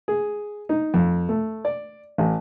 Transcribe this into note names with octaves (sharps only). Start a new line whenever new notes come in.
G#4
D#4
F2
A3
D5
A1